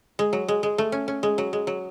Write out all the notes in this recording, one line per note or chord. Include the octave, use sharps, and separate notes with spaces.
G#3
F#3
G#3
G#3
A3
C#4
C#4
G#3
F#3
G#3
F#3